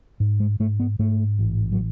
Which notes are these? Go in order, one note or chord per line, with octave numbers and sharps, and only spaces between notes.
G#2
G#3
G#2 A3
B3
G#2 A3
A1
F#3